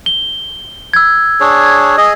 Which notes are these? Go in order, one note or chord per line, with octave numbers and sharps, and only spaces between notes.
G7
E6 G#6
D4 G#4 C#5
G#4 D#5